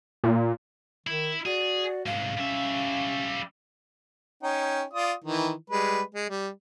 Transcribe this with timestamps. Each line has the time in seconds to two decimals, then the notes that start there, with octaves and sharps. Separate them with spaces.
0.24 A#2
1.07 D#3 E4
1.46 F#4 G#4 D5
2.06 C2 G#2 F5
2.37 G3 C#4 E5
4.43 C#4 D#4 G5
4.94 F4 D5 D#6
5.24 D#3 E3
5.70 G3 G#3 B4
6.14 G#3
6.29 G3